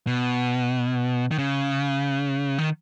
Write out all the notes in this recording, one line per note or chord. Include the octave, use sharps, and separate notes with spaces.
B2
D#3
C#3
D#3